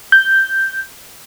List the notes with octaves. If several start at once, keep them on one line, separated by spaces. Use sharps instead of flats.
G6